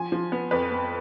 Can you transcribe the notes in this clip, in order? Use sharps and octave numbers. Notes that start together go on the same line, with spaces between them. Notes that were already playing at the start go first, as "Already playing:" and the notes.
Already playing: F3 G#5
F3
B3
F2 B4
B3